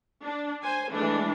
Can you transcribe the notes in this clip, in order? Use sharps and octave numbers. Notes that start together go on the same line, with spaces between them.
D4
C5 G#5
E3 G#3 A3 D4